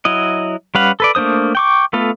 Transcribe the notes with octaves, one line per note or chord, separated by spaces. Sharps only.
F#3 E4 D#5
G3 C#4 B4 F5 F#5
A4 B4 D5
A3 A#3 D4 C5 D#6
G5 C#6 D6
A3 B3 F4 A4